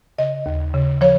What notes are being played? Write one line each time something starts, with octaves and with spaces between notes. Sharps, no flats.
C#3 D#5
D#2
C#3
F3 C#5